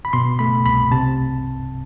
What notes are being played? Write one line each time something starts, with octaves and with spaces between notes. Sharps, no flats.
B5
B2 C6
A3 B5
C2 B5
C3 A5